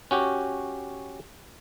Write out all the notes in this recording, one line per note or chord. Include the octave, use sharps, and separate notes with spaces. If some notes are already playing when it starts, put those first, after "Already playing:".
C#4 F#4 G4